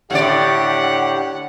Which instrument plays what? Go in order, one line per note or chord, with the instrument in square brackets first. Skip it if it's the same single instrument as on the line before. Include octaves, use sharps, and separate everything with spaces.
[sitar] A2 D3 D5 [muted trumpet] G4 [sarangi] F#5